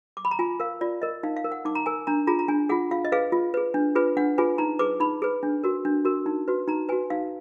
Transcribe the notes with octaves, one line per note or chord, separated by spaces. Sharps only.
D6
B5
A#5
F4 G#5
A#4 F5
F4 D5
A#4 D#5
D#4 F5
F5
A#4
F#5
D#4 D6
A#5
A#4 G#5
D4 A#5
F4 G#4 A#5
A#5
D4 G#5
F4 G#4 F#5
F4 F5
D#5
G#4 B4 F5
F4
G#4 B4
D4
F4 G#4 B4
D4 F#5
F4 G#4 B4 G#5
D#4 A#5
G#4 B4 D6
D#4 B5
G#4 B4
D4
F#4 A#4
D4
F#4 A#4
D#4
F#4 B4
D#4 A#5
F#4 B4 G#5
D#4 F5